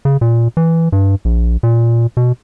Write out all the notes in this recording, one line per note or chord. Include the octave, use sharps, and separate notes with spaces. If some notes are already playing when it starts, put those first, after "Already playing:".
C#3
A#2
E3
G2
A#1
A#2
B2